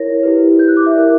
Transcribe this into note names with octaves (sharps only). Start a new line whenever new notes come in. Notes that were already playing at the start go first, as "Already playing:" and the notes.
Already playing: E4 A#4 C#5 A#6
E4 G4 B4
G6
F#6
D6
E5
E4 A#4 D5